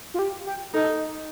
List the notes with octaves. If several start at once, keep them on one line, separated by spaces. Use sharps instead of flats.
F4
G4
G4
D#4 A4